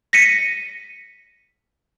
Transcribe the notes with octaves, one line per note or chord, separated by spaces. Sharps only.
A#6 B6 C#7 D#7